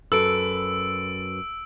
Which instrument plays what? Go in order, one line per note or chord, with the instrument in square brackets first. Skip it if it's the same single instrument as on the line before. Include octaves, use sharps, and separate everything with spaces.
[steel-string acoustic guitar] F#2 B4 [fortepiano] A4 [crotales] E6 D7